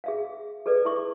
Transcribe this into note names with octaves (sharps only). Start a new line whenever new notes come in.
G#4 E5 F5
G#4 A4 B4 D5
E4 E5 C#6 D6